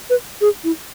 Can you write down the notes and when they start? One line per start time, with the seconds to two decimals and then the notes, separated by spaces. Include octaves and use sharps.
0.10 B4
0.41 G#4
0.64 E4